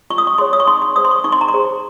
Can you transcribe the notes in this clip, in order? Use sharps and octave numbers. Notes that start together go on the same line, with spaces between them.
F4 C#6
D#6
C#6
G#4 C#5 C6
D#6
C#6
D#4 C6
C6
G#4 C5 D#6
C6
C#6
D#4 C#6
C6
A#5
C6
G#4 C5